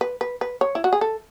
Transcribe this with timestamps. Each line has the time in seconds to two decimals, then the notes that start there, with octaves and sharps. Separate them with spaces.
0.01 B4
0.21 B4
0.41 B4
0.61 C#5
0.75 E4
0.84 F#4
0.93 G#4
1.01 A4